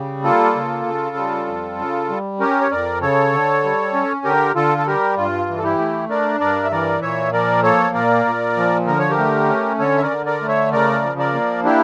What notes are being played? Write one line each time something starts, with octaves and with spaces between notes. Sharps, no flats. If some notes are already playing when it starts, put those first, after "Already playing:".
Already playing: C#3 G3
A#3 F4 A4
C#3
C#3
G3
F2
C#3
G3
C#4 G4 A#4
C#5
F2 A#4 D5
C#3 A4 C#5
D3
G3
C#4
D3 G4 A#4
D3 F4 A4
A4
G3 G4 A#4
G2 F4
E3
A4
E4 G4
A3
D4 A#4 D5
G2 A#4 D5
E5
E3 A#4 D5
A#2 C#5 E5
F3 A#4 D5
A#3 A4 C#5
A#2 A#4 D5
A#2
F3
D3 A#4
C#5
G4 A#4
A3
C#4
D3 A4 C#5
E5
A#4 D5
D3
A#4 D5
A3
C#5 E5
C#3 A#4 D5
F3
A#4 D5
A#3
D4 E4 G4